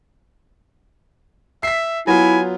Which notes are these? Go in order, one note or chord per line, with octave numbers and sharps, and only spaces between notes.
E5 B6 C7
F#3 B3 E4 F4 G#5